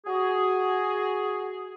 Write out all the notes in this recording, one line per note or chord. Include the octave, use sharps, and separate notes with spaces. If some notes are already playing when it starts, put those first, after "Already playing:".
F#4 G#4